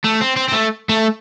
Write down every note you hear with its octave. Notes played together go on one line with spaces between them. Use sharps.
A3
C4
C4
C4
A3
A3